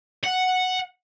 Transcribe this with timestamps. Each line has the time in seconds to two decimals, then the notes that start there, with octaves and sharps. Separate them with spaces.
0.24 F#5